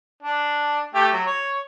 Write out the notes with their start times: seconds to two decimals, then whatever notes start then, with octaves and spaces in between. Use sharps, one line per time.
0.23 D4
0.95 A3 G4
1.13 F#3
1.27 C#5